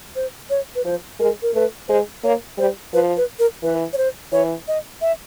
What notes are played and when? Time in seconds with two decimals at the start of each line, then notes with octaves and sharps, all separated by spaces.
0.16 C5
0.50 C#5
0.75 B4
0.85 F3 C5
1.19 G#3 A#4
1.42 A#4
1.54 A3 B4
1.88 G#3 C5
2.24 A#3 C#5
2.58 G3 C5
2.93 F3 B4
3.17 B4
3.39 A#4
3.63 E3 B4
3.93 C#5
3.98 C5
4.32 E3 C#5
4.68 D#5
5.01 E5